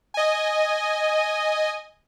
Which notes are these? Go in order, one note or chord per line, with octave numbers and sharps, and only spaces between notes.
D#5 G#5